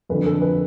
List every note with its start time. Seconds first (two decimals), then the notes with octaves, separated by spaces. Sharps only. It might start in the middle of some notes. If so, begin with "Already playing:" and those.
0.09 F2 D3 F3 B4
0.26 A4
0.42 B4